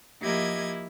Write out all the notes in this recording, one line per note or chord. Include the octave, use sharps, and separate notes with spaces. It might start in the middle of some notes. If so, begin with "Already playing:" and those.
F3 A#3 E4 G4 D#5 G#6